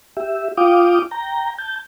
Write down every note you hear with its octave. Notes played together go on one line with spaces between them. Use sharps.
G4 E5
F4 F5 G5 D6 D#6
G5 A#5
A5 G6